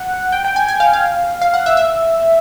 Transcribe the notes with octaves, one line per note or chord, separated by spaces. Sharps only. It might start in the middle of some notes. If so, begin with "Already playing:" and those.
Already playing: F#5
G5
G5
G#5
G#5
F5
F5
F5
F#5
E5
E5